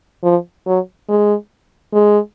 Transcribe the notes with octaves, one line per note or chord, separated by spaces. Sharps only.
F3
F#3
G#3
G#3